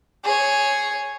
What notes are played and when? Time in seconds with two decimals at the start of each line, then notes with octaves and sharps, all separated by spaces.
0.25 G#4 C#5